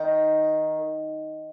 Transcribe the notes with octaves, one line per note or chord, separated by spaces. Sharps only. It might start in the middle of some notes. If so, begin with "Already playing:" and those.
Already playing: D#3